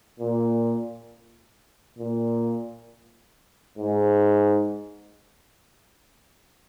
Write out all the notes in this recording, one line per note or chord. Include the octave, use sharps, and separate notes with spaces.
A#2
A#2
G#2